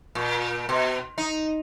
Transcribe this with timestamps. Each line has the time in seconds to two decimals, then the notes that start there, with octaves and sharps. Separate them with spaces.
0.15 A#2
0.69 B2
1.18 D#4